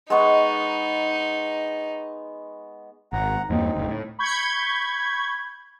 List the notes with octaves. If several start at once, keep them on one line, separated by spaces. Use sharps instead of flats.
G#3 B3 D#4 C#6
G#1 F#5 A#5
E2 G2 A#3 C4 D#4
F#1 D2
A2
B5 C#6 G6 G#6